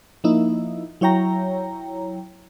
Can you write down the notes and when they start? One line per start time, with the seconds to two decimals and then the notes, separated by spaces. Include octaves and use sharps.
0.24 F3 A#3 D#4 E4
1.01 F#3 E4 C#5 G5 A#5